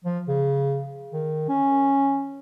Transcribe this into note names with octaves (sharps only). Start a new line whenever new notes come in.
F3
C#3
D#3
C#4